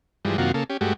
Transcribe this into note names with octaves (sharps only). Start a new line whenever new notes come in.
G2 E3 F3 G3 G#3
F#2 C3 D#3 A#3 F4 F#4
C#3 A#3 A4
C#4 G4
G2 G#3 A3 F#4 G4